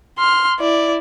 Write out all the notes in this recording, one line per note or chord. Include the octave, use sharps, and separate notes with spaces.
C6 F6
E4 D5